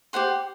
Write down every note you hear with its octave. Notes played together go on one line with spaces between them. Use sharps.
G4 C5 F#5 C6